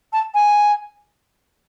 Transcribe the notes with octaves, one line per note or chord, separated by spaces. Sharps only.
A5
G#5